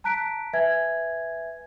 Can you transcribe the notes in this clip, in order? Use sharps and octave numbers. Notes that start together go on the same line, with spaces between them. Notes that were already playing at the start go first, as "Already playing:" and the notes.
A5 A#5 F#6 B6 D7
B4 E5 G#5 G#6